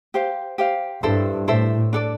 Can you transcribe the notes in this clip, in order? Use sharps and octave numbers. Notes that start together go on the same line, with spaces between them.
G4 C5 F5
G4 C5 F5
G2 E4 A4 C5 E5
A2 E4 A4 C5 E5
D4 A4 D5